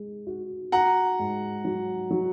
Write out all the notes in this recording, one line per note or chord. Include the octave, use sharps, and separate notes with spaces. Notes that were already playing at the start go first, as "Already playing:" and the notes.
Already playing: G#3
F#4
F#4 F#5 A#5
G#2
F#3
F#3